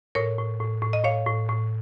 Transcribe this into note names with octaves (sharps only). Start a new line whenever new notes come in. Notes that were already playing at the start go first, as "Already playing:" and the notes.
A2 A#4 C#5
A2
A2
A2
D#5
A2 C#5 F5
A2
A2